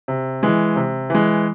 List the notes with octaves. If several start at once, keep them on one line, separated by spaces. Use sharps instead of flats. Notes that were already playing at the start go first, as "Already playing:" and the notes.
C3
E3 G#3
C3
E3 G#3